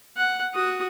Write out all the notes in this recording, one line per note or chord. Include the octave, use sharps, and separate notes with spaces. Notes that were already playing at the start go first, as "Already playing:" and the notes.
F#5
F#4 D#6